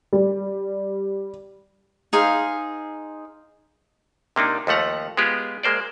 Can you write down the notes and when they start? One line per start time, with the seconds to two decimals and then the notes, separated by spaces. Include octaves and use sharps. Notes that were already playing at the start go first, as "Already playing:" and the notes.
0.13 G3
2.13 D#4 G#4 C5 F5
4.36 C3 A#3 D4 D#4
4.67 D#2 F3 A3 F#5 A#5
5.17 G#3 B3 F4 G4 G#4
5.63 G#3 A#3 C5 D5